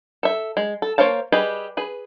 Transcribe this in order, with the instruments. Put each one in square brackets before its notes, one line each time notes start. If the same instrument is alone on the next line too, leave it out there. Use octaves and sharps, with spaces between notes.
[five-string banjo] A4 E5
G#3
A4
A#3 C5 C#5 F5 A5
G3 G4 G#4 B4 D#5
G#4 B4